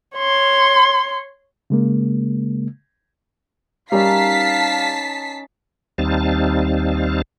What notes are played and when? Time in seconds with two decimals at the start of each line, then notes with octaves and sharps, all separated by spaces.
0.16 C#5 C6
1.70 C#3 G#3 A#3
3.92 G3 C#4 D#4 A#4 F5 A5 B6 C7
5.98 D#2 G3 C4 D#4 F5 A5